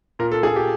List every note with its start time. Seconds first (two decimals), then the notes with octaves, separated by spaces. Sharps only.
0.19 A#2 A#4
0.32 A4
0.43 A#2 G#4
0.56 G4